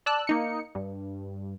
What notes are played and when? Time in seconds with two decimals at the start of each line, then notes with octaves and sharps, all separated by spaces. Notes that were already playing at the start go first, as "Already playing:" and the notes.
0.06 D5 A5 E6 F#6
0.27 A#3 D#4 C#7
0.75 G2